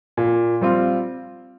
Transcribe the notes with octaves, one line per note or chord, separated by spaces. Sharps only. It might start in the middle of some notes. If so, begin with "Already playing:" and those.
A#2
G3 C4 F4